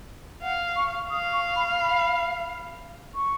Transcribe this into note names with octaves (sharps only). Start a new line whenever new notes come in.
F5 F#5
C#6
F5 D#6
C#6
B5
B5
C#6